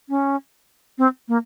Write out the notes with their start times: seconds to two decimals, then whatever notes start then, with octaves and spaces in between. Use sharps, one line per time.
0.09 C#4
0.98 C4
1.28 A#3